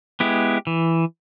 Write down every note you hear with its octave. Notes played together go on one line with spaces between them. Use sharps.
G#3 B3 E4 G4
E3